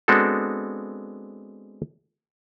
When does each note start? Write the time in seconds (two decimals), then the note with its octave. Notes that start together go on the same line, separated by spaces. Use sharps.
0.08 G#3 B3 C4 D4 F#4 A4